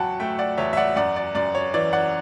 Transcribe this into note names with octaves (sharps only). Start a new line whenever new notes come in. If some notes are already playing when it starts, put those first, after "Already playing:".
Already playing: E2 F#3 F#5 G5 A5 B5 C#6
A3 E5 G5
D5 F#5
E2 C#5 E5
E5
D5 F#5
F#2 D5 F#5
D5
F#2 D5
C#5
E3 D5
D5 F#5